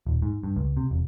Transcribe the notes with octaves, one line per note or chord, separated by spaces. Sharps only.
D#1
G#2
G2
C#2
C3
E1